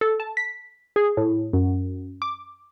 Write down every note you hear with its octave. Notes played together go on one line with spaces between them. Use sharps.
A4
A5
B6
G#4
A2
F#2
D6